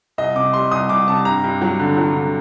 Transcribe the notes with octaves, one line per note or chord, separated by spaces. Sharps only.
C2 D#5
C3 D6
G3 C6
C2 D#6
C2 D6
C3 A5
G2 A#5
G2
F#3
D3
F#3
D3